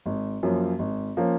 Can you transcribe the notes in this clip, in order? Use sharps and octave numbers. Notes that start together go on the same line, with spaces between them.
G#1
F#2 F3 A#3 C#4
G#1
F3 A#3 C#4